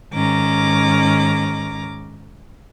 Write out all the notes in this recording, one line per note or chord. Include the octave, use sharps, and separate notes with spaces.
G#2 D#3 C#4 A#5 D6